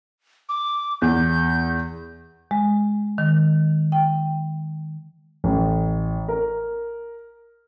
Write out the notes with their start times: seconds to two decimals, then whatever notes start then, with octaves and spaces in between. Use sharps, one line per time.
0.49 D6
1.02 E2 G6
2.51 G#3
3.18 D#3
3.92 G5
5.44 A1
6.28 A#4